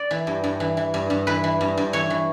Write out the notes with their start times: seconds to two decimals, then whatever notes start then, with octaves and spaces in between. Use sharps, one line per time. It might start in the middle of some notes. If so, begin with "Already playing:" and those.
Already playing: D5
0.11 E3
0.27 G2
0.44 G2
0.60 E3
0.77 E3
0.94 G2
1.10 G2
1.27 E3 B4
1.44 E3
1.61 G2
1.77 G2
1.93 E3 C#5
2.10 E3